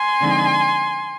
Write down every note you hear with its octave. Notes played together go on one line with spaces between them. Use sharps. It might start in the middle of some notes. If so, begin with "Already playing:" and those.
Already playing: G#5 C6
D3 F3 G#3 C4 D#4